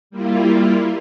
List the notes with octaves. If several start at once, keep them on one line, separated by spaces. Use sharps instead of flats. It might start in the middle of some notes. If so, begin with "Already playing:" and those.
G3 A#3 E4 F4